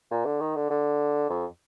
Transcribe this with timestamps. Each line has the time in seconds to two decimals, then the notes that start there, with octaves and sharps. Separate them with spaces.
0.11 A#2
0.25 D3
0.40 D#3
0.55 D3
0.70 D3
1.30 F2